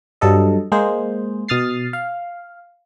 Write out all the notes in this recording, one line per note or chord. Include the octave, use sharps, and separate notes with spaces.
G2 F#3 A4 D#5
G#3 A#3 G#4 C5
B2 D#6 F6 A6 C7
F5